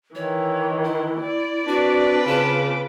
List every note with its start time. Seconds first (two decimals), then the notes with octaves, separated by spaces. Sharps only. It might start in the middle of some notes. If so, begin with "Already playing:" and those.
0.15 D#3 E3 C#5
0.84 E4
1.21 D5
1.68 C4 D4 F#4 B4
2.27 C#3 F4 A5 D6